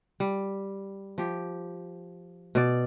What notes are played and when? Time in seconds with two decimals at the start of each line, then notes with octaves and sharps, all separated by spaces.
0.20 G3
1.18 F3 G4
2.55 B2 D5